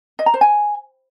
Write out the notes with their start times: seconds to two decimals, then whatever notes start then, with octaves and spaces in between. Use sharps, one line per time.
0.19 D#5
0.26 A#5
0.34 C5
0.41 G#5